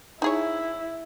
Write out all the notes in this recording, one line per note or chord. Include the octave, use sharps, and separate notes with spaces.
D#4 E4 G#4 C#5